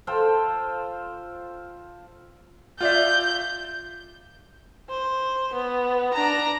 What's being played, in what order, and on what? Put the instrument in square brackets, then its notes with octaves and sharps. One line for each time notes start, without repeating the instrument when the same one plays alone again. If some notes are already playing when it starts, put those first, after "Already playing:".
[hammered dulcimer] F4 A4 C5 G5
[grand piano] F4 D5 E5 [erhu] G6
[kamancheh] C5
B3
D4 A#5